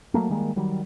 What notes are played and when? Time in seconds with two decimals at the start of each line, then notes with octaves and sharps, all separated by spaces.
0.14 F#3 G3 A3 A#3
0.30 D#3 G3 G#3 A#3
0.56 D#3 F#3 G3